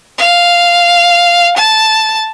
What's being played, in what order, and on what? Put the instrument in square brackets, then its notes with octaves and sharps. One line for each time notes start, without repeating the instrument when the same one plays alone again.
[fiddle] F5
A5